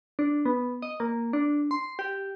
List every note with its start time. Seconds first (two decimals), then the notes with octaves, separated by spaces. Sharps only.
0.19 D4
0.45 B3
0.82 D#5
1.00 A#3
1.33 D4
1.71 C6
1.99 G4